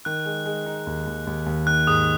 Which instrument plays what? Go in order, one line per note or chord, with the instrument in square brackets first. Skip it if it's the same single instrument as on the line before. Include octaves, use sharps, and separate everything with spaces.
[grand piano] D#3 [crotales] F#6
[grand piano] G#3
G#3
D#4
D#2
D#2
D#2
D#2
[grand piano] D#3 [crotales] F#6
[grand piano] G#2 [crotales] D#6